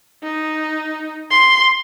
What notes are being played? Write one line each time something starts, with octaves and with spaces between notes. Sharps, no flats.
D#4
C6